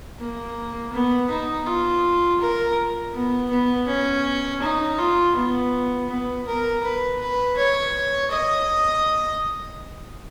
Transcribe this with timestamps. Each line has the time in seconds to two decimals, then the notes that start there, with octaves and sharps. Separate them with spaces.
0.19 A#3
0.93 B3
1.30 D#4
1.66 F4
2.41 A#4
3.14 B3
3.51 B3
3.87 C#4
4.62 D#4
4.98 F4
5.35 B3
6.09 B3
6.47 A#4
6.84 B4
7.20 B4
7.57 C#5
8.31 D#5